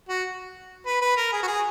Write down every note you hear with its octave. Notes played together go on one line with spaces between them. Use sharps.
F#4
B4
B4
A#4
G#4
F#4
G#4